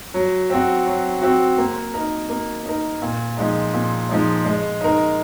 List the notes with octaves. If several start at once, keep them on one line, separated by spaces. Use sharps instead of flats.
F#3
C4 F#4
F#3
C4 F#4
A#3
D#4 A#4
A#3
D#4 A#4
A#2
F3 G#3 D#4
A#2
F3 G#3 D#4
G#3
D#4 A#4